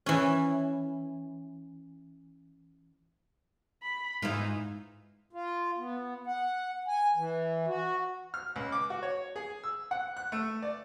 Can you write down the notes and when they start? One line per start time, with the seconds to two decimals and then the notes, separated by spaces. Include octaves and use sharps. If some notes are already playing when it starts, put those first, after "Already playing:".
0.06 E3 C#4
3.83 B5
4.22 G#2 E3 B3 D#4 F4
5.33 F4
5.79 B3
6.26 F#5
6.88 G#5
7.15 E3
7.67 F#4
8.34 F6
8.56 C#2
8.72 D6
8.90 F#4
9.03 C#5
9.36 G#4
9.64 E6
9.91 F#5
10.17 F#6
10.32 A3
10.62 D5